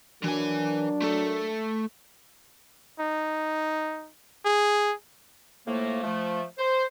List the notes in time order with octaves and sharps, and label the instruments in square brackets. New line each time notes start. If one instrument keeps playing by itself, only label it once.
[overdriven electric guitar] E3 G#5 [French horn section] F#3 D4 A#4
[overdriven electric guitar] A3 A4
[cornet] D#4
G#4
[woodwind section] A2 F3 A3 A#3
F3 A3
C5